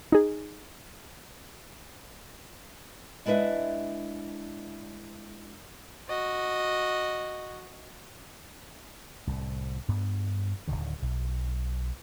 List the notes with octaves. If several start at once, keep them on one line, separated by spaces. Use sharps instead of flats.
D#4 G#4
G#3 D4 E4 B4 E5 F#5
F#4 D#5
C2 A2
G2 B3
D1 D2 D3 D#3
B1